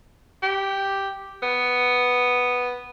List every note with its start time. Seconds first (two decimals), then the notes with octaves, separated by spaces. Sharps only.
0.43 G4
1.43 B3